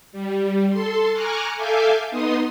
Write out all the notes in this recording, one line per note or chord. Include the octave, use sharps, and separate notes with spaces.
G3
A4 C6
G#5 A#5 C#6 D6 F6 F#6
A4 E5 F5 G#5 D6 G6
B3 D#4 C6 D#6